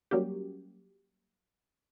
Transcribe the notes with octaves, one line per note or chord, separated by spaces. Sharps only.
F#3 G3 A#3 C#4 F#4 G4